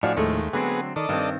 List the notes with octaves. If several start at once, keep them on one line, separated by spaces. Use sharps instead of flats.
A2 F3 D4 F#4 F5 G#5
D#2 G#3 A3
D3 F#3 B3 C4 G#4
D#3 A4 D5 D#5
G2 D#3 C4